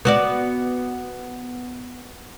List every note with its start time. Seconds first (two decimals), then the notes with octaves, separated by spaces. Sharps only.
0.05 B3 F#4 D5